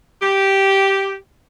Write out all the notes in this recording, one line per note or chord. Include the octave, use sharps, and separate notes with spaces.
G4